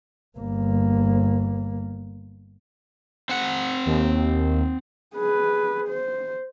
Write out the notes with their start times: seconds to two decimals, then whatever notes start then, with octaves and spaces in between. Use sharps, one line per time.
0.39 G1 A#3
3.29 C4 F#5
3.86 D#2
5.14 G#4 B4
5.88 C5